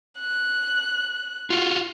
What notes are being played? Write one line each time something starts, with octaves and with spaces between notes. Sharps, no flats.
F#6
F4 F#4